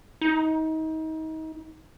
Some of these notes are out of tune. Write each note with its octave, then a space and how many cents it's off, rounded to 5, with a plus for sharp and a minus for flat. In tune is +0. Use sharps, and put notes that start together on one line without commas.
D#4 +30